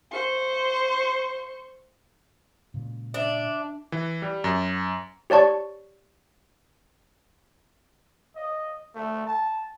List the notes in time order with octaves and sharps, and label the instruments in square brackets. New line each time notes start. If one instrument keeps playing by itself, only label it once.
[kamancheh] C5 C#6
[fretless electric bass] A#2 C#3 G#3
[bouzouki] D4 [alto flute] E5
[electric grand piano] E3
G3
F#2
[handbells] G4 C#5 D5 A5 C#6
[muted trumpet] D#5
A3
A5